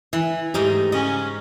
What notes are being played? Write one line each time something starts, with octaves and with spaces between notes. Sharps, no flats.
E3 E4
G#2 A3 D#4 G4 A#5
C#3 C#4 D#5